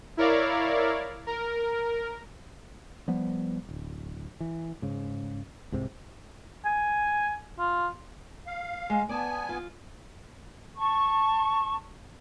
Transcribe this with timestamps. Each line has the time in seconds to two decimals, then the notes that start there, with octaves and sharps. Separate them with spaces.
0.17 E4 A#4 C#5 D5 F5
1.27 A#4
3.08 F3 G3 B3
3.69 D1
4.40 E3
4.82 G#2 C#3
5.72 C2 G#2 C3
6.65 G#5
7.59 F4
8.47 F5
8.90 G#3
9.09 B3 D5 G#5 A5
9.49 F4
10.77 A5 C#6